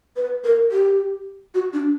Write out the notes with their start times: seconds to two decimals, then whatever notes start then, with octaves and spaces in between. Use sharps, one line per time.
0.16 B4
0.44 A#4
0.71 G4
1.55 F#4
1.73 D4